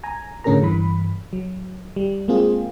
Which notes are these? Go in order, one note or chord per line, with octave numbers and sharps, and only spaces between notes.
G#5 A#5
A2 D3 C#4 G#4 A#4 A#5
G2 E3 B5
F#3
G3
G#3 A#3 C4 F4 G#4